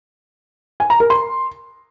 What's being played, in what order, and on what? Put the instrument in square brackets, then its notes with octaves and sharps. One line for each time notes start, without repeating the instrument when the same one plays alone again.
[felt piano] G#5
A#5
A#4
C6